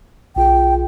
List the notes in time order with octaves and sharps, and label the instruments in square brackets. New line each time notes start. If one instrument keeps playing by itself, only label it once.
[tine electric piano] B1 F4 G#4 [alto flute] G5